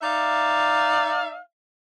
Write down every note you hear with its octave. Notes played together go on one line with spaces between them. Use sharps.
D#4 D5 E5 F5